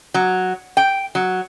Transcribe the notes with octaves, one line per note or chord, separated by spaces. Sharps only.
F#3
G5
F#3